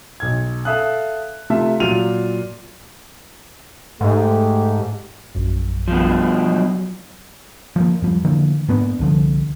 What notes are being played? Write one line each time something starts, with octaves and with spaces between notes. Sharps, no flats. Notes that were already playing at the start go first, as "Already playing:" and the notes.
B1 G#6
A4 E5 F5 D#6 F#6
C3 A3 F4 E5
A#2 F#3 F4 D#7 F7
G#2 A3 G4
A#1 F#2
B2 F3
F#3
F3 G#3 A#3
F2 F3 G3
D3 E3 F3 A#3
G#2 A#3 B3 D4
C2 D3 F3